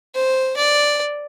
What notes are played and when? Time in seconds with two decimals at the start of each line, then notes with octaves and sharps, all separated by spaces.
0.15 C5
0.57 D5